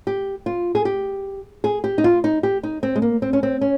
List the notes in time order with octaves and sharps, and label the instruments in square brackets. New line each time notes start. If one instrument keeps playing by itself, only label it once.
[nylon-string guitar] G4
F4
G#4
G4
G#4
G4
D#4
F4
D#4
G4
D#4
C4
G#3
A#3
C4
C#4
C4
C#4